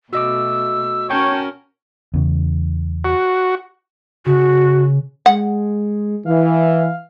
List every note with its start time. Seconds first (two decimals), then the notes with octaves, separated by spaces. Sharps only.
0.13 B2 A3 F#4 D#5 D6 E6
1.10 C#4 F#4 A#4 C#5 G5 A5 C#6 G6
2.14 E2 C#3
3.05 F#4
4.26 C#3 F#4
5.26 G#3 F#5
6.26 E3 F5